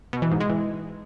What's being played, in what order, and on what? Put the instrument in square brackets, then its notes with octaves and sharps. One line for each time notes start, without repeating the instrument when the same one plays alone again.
[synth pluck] B2
E3
G#2
G#3
E3